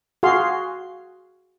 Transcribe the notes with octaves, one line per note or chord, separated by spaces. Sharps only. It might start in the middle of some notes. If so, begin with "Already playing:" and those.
F#4 G#4 F5 C6